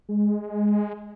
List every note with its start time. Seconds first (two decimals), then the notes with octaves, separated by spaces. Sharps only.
0.09 G#3